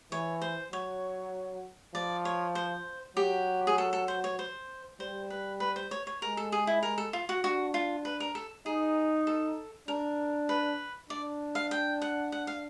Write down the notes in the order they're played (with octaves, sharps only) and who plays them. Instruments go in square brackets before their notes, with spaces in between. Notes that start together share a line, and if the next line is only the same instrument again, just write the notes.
[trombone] E3 [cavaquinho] C#5
[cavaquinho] C5
[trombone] F#3 [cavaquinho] C#5
[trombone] F3 [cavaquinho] D5
[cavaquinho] C#5
C5
[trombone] F#3 [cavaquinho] G4
[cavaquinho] G#4
A4
A4
C5
C#5
C5
[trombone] G3 [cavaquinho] C5
[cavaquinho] B4
B4
C5
C#5
C#5
[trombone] G#3 [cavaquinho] A#4
[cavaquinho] A4
G#4
E4
A#4
A4
F4
F#4
[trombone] D4 [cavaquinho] F#4
[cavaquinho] F4
B4
A#4
A4
[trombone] D#4 [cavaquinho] G#4
[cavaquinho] A4
[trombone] D4 [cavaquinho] A#4
[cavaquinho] B4
[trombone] D4 [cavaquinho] D5
[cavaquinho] F5
G5
F#5
F#5
F5